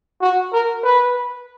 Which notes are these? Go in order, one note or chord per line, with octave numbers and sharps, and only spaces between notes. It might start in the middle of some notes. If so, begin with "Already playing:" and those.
F#4
A#4
B4